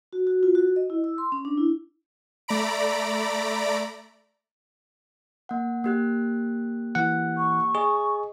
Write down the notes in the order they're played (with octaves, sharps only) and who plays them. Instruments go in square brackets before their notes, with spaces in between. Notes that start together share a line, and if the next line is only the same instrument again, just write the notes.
[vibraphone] F#4
F#4
F4
F#4
D#5
E4
E6
C6
C#4
D4
E4
[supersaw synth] A3 D5 A#5 B5 D7
[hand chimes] A#3 F#5
A#3 G4 F#6
[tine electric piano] E3 F#5
[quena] C#6
[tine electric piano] G#4 [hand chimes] D#5